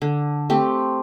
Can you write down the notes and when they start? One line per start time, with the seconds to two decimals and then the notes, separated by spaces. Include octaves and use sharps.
0.02 D3
0.50 A3 C4 G4